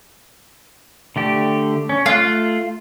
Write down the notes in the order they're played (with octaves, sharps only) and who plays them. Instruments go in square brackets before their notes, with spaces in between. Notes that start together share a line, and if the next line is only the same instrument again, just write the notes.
[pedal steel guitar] D3 A3 G4
C#4
[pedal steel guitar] A3 F6 F#6 [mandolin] F4